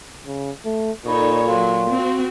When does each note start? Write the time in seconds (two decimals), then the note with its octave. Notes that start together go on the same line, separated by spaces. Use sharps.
0.26 C#3
0.65 A3
1.06 A#2 D#4 A4 C#5 D5 B5 C#6
1.48 F#3 F5 C6
1.91 C4 F#4